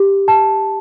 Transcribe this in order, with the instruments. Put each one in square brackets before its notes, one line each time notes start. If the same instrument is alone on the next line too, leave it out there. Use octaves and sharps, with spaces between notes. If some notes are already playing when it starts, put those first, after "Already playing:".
Already playing: [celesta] G4
A5